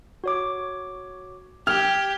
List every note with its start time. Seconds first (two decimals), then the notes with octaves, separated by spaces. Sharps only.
0.24 F#4 C#5 D6
1.67 G4 F6 G#6